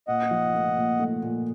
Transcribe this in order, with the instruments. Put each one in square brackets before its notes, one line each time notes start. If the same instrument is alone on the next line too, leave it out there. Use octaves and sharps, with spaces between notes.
[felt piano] A#2 [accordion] D#5 F#5
[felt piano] F3
A3
A#2
A3
A#2